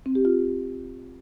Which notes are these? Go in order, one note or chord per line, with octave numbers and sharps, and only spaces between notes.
C4
G4
F4